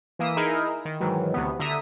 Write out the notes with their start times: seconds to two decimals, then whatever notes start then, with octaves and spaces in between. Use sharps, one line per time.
0.19 E3 A#3 D#6 E6 B6
0.37 D#4 E4 G#4 A#4
0.85 D#3
1.00 G#2 D#3 E3 F#3
1.34 D2 C3 B3
1.59 D3 E5 A#5 D#6